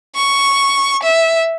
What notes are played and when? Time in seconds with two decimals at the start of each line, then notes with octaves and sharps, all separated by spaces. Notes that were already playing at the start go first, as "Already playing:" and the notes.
0.16 C#6
1.03 E5